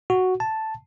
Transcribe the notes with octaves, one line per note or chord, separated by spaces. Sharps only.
F#4
A5